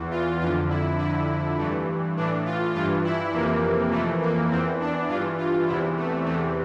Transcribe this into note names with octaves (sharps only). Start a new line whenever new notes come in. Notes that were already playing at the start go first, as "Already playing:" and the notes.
Already playing: E2 E3
F4
F2 D3 F4
E4
F2 D3 E4
G2 E3 A3
A2 E3 D4
F4
G2 E3 F4
E4
F2 C3 E3 A#3
F2 E3 A3
A#3
E2 E3 C4
D4
G2 E3 F4
F4
E2 C3 E3 E4
A3
E2 C3 E3 A3